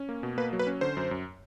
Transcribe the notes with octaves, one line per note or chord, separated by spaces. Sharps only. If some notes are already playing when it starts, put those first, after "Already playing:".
Already playing: C#4
A#3
B2
A#3 B4
F#3
B4
C#4
D3 C5
F#2
F#2